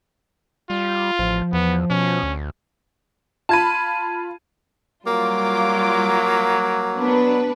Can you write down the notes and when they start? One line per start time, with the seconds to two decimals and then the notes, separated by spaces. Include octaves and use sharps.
0.70 G3 F4
1.19 A1 F3
1.53 E2 B3
1.90 B2 C#4
2.23 D2
3.49 F4 A5 B5 G#6 D#7
5.06 F#3 G3 A#3 F4 D6
6.96 B3 D4 B4